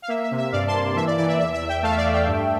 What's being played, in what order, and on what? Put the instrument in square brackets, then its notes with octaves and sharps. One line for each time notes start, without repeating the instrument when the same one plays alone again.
[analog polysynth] F5
A#3 E5
E5
C3
E5
G2 D5 F5
A5 C6
A#3
E3 E5
D5
E3 D5
E5
E2 E5
E5
E2
E5 G5
A3 F5 A5
E5
D5 F5
A3
E5 G5
G2